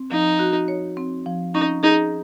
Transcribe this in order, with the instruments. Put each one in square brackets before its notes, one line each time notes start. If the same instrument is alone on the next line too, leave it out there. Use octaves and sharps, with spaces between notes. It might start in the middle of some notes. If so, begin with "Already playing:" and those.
Already playing: [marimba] C4
[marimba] F3 [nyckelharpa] D#4
[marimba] F#4
C#5
C4
F3
[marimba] C#4 [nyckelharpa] D#4
[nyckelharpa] D#4 [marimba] G#4